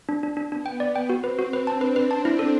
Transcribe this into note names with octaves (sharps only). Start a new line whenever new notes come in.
D4
D4
D4
B3 D4
G5
B3 D5
G5
C4 F#4
B4
F#4
B4
D4 A5
B4
B4
A5
E4
A4